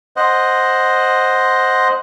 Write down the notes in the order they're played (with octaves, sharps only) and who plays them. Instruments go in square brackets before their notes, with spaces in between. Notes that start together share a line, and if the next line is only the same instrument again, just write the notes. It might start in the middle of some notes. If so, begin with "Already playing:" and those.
[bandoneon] C5 D#5 F#5